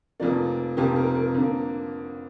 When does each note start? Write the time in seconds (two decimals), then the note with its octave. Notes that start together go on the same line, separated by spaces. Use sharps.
0.20 F1 F2 F3 A#3 D5
0.77 F1 F2 F3 A#3 G4
0.96 A#4
1.15 A#4
1.35 F2 D3 A#3